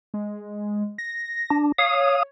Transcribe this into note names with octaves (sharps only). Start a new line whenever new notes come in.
G#3
A#6
D4
C#5 F5 D#6